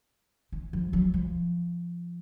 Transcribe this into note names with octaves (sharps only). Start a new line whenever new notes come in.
E3
F3
F#3
F3